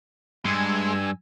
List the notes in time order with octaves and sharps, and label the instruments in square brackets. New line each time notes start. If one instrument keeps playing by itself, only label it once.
[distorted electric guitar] G2 [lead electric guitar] G#3 [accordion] G#5 E6